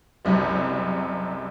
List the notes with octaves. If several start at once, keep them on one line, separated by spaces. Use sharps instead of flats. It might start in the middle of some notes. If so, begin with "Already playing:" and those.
F#1 C2 F#2 C3